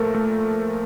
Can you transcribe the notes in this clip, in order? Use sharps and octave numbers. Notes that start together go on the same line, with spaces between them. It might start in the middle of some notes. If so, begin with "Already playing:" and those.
Already playing: A#2 F3 A3 A4 A#4
A3